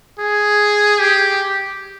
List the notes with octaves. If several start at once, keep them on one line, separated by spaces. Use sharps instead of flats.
G#4
G4